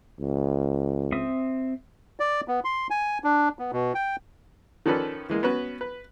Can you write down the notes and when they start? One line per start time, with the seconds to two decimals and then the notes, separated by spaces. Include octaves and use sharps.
0.19 C#2
1.12 C4 E5 D#6
2.20 D5
2.48 B3
2.65 C6
2.90 G#5
3.24 D4
3.59 B3
3.72 B2
3.95 G5
4.86 D#3 F3 C#4 A4 B4 D5
5.30 E3 G#3 A#3
5.43 B3 C#4 F#4 B4
5.81 B4